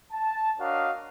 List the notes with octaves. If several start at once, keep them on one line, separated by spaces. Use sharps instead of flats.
A5
D4 F#4 A#4 C#5 D#5 F5